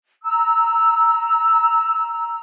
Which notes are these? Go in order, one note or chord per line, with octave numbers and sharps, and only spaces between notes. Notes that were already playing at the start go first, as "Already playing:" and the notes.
A#5 E6